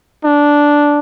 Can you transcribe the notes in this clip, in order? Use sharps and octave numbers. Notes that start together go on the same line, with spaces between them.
D4